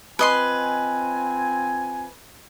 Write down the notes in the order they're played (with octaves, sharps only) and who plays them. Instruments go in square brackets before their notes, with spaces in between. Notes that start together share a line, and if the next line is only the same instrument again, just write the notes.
[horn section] C4 F4 G#5 [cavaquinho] B4 D#5 C6